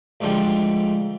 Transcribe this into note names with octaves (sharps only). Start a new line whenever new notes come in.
D2 G#2 D3 F3 G3